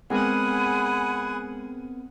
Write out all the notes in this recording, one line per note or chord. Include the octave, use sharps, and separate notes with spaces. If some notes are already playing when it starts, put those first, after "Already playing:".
G#3 B3 C4 G#4 A#4 F#5 G#5 B5